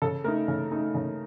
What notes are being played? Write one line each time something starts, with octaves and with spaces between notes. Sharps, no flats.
C#3 A4
A3 D#4 A#4
C#3
A3 D#4
C#3